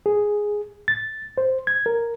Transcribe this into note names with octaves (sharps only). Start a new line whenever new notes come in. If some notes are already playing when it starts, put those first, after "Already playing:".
G#4
A6
C5
G#6
A#4